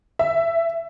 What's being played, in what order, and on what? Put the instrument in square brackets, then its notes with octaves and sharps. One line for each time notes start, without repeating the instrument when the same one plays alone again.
[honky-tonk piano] E5